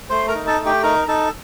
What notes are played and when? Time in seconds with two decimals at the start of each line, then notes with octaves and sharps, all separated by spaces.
0.10 A3 C5 C6
0.28 A#4 A#5
0.35 D#4
0.47 A4 A5
0.59 A3
0.66 G4 G5
0.83 D#4 A#4 A#5
1.02 A#5
1.08 D#4 A4 A5